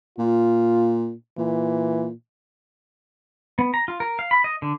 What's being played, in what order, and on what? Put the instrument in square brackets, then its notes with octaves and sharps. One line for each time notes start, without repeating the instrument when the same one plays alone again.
[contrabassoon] A#2 [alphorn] F4
[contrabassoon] A#2 [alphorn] E3
[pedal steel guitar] B3
A#5
F4
A#4
F5
B5
D#5
D3